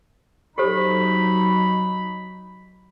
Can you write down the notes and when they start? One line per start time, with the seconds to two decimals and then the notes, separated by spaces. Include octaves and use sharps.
0.58 F#3 D#4 G4 A4 C5 B5